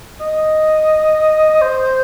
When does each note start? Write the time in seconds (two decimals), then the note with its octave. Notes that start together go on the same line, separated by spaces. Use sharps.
0.20 D#5
1.62 C5